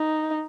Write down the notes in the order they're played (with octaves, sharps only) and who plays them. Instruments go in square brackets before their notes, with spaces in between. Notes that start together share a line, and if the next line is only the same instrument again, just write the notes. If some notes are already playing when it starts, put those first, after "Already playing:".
Already playing: [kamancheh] D#4